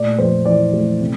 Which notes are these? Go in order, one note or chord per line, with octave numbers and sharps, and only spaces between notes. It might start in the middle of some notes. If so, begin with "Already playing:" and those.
Already playing: A#2 A3 D5
F2 C5
E3 D5
A3
C3